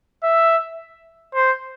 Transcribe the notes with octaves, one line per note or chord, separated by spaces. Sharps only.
E5
C5